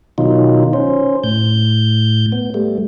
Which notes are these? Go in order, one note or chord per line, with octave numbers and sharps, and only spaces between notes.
B2 D#3 F#3 D#4 F4
C#4 C5
A2 G6
B3
G3 A3